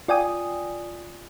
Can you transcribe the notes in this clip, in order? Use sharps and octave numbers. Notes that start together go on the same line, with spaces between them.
F4 D5 G5 G#5 D#6